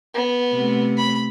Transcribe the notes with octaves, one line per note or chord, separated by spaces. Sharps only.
B3
C3 A3
B5